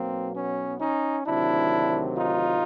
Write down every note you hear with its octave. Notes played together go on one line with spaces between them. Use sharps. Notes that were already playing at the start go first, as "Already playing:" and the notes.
Already playing: B1 B2 F#3 A#3 C4
B3 C#4
C#4 D#4
D2 C3 D#3 F#3 D4 E4
D#4 F4